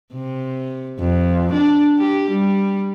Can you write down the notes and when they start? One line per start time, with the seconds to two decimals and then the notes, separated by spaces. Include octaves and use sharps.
0.13 C3
0.99 F2
1.53 D4
1.98 G4
2.31 G3